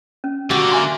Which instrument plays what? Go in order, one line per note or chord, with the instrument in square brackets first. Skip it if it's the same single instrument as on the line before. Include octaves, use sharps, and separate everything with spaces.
[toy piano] C#4
[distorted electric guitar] D3 [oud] G3 F#4 [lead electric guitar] A#3
[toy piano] E5 G#5 C6